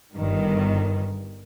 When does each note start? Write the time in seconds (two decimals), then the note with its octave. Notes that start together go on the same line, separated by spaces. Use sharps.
0.17 G1 G2 D#3